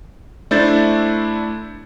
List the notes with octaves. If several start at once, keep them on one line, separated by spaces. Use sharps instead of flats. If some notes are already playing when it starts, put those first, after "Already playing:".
A3 D4 E4 C5 G6 A6